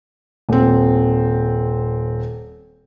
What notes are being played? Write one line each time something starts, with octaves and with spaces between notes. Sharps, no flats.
D#1 C4